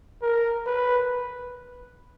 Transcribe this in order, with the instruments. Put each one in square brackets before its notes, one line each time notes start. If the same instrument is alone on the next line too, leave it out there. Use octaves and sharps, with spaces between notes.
[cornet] A#4
B4